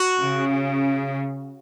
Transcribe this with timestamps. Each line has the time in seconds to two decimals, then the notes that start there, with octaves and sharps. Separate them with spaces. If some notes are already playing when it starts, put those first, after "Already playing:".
Already playing: F#4
0.19 C#3